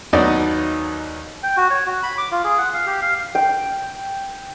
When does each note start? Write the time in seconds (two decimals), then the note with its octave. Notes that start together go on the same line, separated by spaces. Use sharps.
0.13 D#2 F#3 B3 D#4 D5 D#5
1.43 G5
1.57 F#4
1.71 C#5
1.86 F#4
2.03 B5
2.18 D6
2.31 F4
2.44 G#4
2.58 F#5
2.74 F5
2.87 G4
3.02 F5
3.35 G5